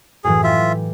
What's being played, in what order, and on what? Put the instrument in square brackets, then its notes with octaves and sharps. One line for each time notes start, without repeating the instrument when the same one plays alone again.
[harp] F#2 A2 E3 [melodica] G#4
[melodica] F4 E5 [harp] G4